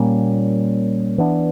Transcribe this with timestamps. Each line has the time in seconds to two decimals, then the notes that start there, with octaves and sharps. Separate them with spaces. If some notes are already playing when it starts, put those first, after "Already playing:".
Already playing: A#2 G3 A#3 C#4
1.18 E3 B3 D4